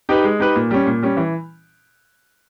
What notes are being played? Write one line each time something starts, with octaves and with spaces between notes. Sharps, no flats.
D#4 G4 B4
G#3
D#4 G4 B4
A#2
G3 C#4
A#2
G3 C#4
E3